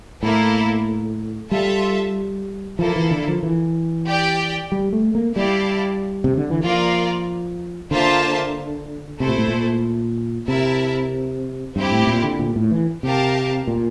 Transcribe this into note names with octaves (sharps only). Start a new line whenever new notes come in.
A2 A#3 E4 A4
G3 F4 A4 E5 A5
F3 A#3 E4 A4
E3
D3
F3
E3
G4 D5 G5
G3
A3
A#3
G3 E4 G4 D5 F5 A5
C3
D3
E3
F3 A#3 F4 A#4 D5 F5
D3 A#3 F4 C5 E5 A5
C3 A3 E4 A4 C5
A#2
A2
A#2
C3 E4 A#4 E5 A5
G2 C4 E4 G4
A2
A#2
D3
A#2
A2
E3
C3 G4 A#4 F5 A5
A#2